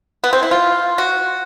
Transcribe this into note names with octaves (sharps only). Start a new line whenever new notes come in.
B3
C4
E4
F4
F#4